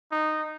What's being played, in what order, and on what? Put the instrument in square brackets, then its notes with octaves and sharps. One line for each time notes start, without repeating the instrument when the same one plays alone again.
[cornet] D#4